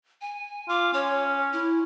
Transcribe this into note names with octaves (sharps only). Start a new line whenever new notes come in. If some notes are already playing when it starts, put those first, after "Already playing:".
G#5
F4 D6
C#4 C#5
E4